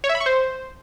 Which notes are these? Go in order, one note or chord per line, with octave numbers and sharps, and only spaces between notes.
C#5
E5
B5
C#6
C5